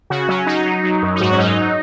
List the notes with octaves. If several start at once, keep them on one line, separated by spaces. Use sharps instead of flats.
C#3 F#4
F#3 C#4
F#3 D#4
F#3
F#3
F#2
D#4
G#2 F#4
C#4
F#3 D#4